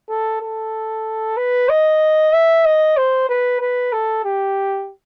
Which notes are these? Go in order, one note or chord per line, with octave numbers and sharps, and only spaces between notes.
A4
A4
B4
D#5
E5
D#5
C5
B4
B4
A4
G4